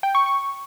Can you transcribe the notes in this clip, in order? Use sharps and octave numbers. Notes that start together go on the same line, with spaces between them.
G5
C#6
C#6